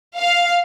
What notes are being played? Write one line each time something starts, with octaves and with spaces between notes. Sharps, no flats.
F5